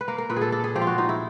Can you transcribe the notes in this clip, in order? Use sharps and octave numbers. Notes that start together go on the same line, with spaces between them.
B4
A#3 A#4
A#4
A#2 B4
G#4 A4
D4 A4
G#4
F3 G4
F4
F#4
F3 D#4
E4